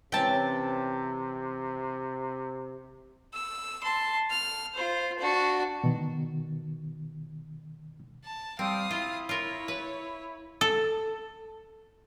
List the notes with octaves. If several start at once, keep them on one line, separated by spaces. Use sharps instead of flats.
C3 E3 C4 C#4 G5 A5
E6
A5 C6
F6
F4 C5
D4 F#4
B2 D#3
A5
G3 C4 F5 D#6
E4 F4
F4 A#4 C#5
B4
A4